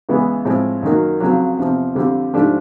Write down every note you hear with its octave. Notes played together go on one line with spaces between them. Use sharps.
E2 C#3 E3 G#3 B3
A2 F3 G#3 C4
F#2 D#3 F#3 A#3
F2 C#3 F#3
E2 C3 F3
F2 D3 G3
G#2 F3 A3 D4 G4